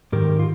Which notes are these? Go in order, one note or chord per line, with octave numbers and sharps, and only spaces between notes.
G#2 D#3 G4 A#4
F4